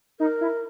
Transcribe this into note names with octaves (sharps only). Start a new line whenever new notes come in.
D#4 A#4
E4